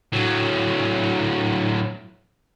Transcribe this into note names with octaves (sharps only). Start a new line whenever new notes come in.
A2 F#3